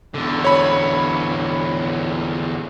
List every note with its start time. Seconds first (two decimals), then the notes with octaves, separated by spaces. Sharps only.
0.14 E2 D3
0.44 C#5 B5